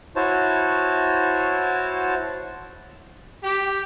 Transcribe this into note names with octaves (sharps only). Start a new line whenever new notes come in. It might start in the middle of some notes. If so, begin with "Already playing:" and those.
E4 F#4 C5 C#5 A5
G4